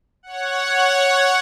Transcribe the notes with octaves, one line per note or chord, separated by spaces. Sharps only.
C#5 F#5